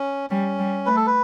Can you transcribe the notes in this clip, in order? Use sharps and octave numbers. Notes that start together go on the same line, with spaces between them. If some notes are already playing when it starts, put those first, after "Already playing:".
Already playing: C#4
G3 C#4
G3
A3 B4
A4
B4